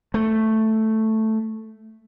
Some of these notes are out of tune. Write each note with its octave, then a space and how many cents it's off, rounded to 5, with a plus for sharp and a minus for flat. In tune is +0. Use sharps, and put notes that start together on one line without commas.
A3 +0